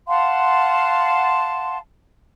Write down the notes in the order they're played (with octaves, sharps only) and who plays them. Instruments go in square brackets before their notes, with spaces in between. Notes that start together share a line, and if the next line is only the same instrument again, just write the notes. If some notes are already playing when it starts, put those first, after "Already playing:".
[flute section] F5 F#5 A5 C6